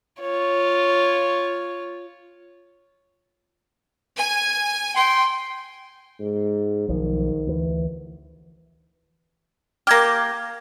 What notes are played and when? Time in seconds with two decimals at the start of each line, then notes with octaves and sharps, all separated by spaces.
0.20 F4 C#5
4.17 G#5
4.96 G5 C6
6.19 G#2
6.89 B1 D#3 F3
7.47 D2 E3
9.87 A#3 G4 F6 G#6 A#6